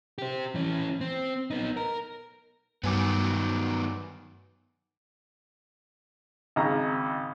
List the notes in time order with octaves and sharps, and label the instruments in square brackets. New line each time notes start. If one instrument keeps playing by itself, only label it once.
[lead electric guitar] G4 C5
E3 C#4
C4
B3 D#4
A#4
[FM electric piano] G2 G#5 D6 [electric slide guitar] D#3 F#3 B3
[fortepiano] G#1 C#3 A#5